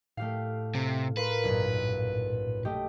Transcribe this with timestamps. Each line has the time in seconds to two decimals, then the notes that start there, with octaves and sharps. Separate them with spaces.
0.17 A2 A3 G4 F5
0.75 C3
1.17 A#4 B4 F5 C6
1.44 B1 G2 A#2
2.65 A3 G4 D#5